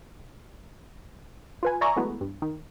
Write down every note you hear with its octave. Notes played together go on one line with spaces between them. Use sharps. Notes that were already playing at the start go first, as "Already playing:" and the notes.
F4 B4 G#5
D5 E5 G#5 A#5 C#6
E3 F#3 G#3 A3 B3 E4
G2
D#3